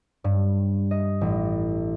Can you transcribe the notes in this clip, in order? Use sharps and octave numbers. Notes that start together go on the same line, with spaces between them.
G2
D#5
A1